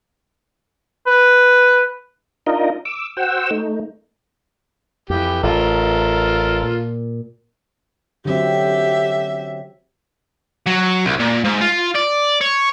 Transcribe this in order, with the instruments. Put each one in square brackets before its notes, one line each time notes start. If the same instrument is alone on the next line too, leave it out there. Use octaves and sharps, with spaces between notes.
[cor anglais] B4
[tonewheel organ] D4 D#4 F4 A#4 D#5
D6 E6
F#4 C5 F#5 G5 E6
A3 D#4
[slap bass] F2 [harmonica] E3 G4
[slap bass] A1 [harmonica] F4 A4 A#4
[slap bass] A#2
[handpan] D3 F#3 C4 [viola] G4 E5
[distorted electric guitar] F#3
C2
A#2
G#2
F4
D5
C#5